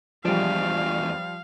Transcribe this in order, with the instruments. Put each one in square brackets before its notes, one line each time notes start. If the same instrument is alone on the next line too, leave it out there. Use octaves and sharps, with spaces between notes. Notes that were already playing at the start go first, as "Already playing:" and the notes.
[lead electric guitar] E2 D4 [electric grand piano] F3 G3 [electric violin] F5